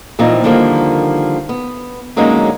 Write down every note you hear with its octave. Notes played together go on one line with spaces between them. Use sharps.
A#2 E3 F3 A#3 C4 D#4
D3 D#3 F3 G3 A#3
B3
D3 F#3 G#3 A#3 C#4 D#4